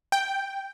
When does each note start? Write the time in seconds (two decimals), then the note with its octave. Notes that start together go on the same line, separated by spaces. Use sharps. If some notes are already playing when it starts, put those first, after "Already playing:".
0.12 G5